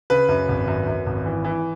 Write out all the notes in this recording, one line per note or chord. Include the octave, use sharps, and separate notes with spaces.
C#3 B4
F#2
G#1
F#2
F#2
G#1
E3
E3